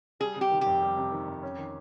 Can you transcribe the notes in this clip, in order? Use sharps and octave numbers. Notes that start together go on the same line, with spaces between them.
G3 G#4
C3
G4
D#3
F2 G4
G3
C3
D#3
F2
C#4
D#3